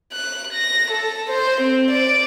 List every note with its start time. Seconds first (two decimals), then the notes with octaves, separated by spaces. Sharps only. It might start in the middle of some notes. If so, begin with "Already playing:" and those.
0.13 F#6
0.53 A#6
0.91 A4
1.30 C5
1.61 C4
1.91 D5